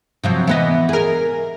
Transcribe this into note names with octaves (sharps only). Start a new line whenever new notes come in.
C3 F3 F#3
E3 B3 D#5
G#4 A#4